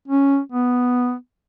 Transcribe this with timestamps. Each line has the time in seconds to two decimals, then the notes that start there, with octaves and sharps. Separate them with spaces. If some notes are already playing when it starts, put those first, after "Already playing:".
0.08 C#4
0.52 B3